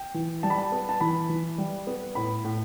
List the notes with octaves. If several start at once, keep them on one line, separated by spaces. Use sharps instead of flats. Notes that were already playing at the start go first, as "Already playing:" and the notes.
Already playing: G5
E3
G3 A5
B5
A5
B3
A5
E3 B5
E3
G3
B3
A2 B5
A2